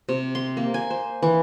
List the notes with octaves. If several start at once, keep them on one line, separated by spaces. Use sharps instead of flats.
C3
C6
A#3
G#5
C5
E3